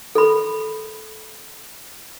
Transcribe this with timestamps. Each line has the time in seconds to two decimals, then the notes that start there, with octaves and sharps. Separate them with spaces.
0.15 A4 B5